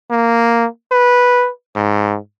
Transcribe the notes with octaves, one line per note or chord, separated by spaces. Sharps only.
A#3
B4
G#2